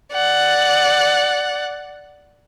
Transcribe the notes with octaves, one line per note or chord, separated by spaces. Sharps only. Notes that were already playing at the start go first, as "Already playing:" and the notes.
D5 F#5